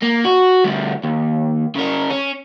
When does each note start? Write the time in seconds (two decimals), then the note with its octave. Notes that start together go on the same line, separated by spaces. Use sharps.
0.02 A#3
0.24 F#4
0.64 D2 G3
1.04 D#2
1.75 C#3 A#4
2.10 C#4